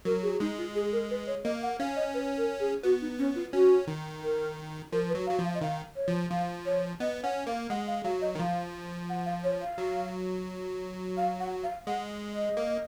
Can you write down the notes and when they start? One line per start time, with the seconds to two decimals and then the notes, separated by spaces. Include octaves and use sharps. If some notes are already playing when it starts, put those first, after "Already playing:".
0.05 F#3 A#4
0.23 G#4
0.40 G#3 D#4
0.58 F4
0.75 G#4
0.93 A#4
1.11 B4
1.27 C#5
1.45 A#3 D#5
1.63 F#5
1.80 C#4 F5
1.96 D#5
2.14 B4
2.38 A#4
2.60 G#4
2.83 B3 F#4
3.01 D#4
3.19 C#4
3.35 F4
3.53 C#4 F#4
3.87 D#3
4.23 A#4
4.92 F3 A#4
5.09 B4
5.15 F#3
5.27 F5
5.31 F#3
5.39 F3
5.44 F5
5.55 D#5
5.61 D#3 F5
5.96 C#5
6.08 F3
6.31 F3 F5
6.66 C#5
7.00 B3 D#5
7.23 C#4 F#5
7.47 A#3 F5
7.70 G#3 F#5
7.87 F5
8.04 F#3 F5
8.22 D#5
8.35 D#3
8.39 F3 F5
9.10 F#5
9.26 F5
9.44 C#5
9.62 F5
9.78 F#3
11.17 F5
11.40 F#5
11.63 F5
11.87 G#3 F#5
12.33 D#5
12.57 A#3